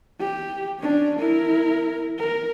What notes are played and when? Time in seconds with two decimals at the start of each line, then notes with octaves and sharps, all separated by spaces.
0.20 G4
0.80 C#4 D4
1.19 E4 A#4
2.18 A#4